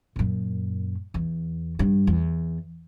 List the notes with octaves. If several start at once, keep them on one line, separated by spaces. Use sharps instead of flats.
F#2 A#2
E2
G2
E2